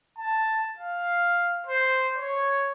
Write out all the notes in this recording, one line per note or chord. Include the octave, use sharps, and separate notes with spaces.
A5
F5
C5
C#5